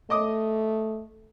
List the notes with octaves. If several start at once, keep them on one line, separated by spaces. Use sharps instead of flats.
A3 D#5 D6 D#6